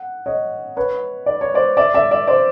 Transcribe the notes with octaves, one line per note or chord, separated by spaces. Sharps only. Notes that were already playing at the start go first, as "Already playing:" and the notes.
Already playing: F#5
C#5 D#5
B4 C#5
D5
C#5
C5 D5
D5 E5
D5 E5
D5 E5
C5 D5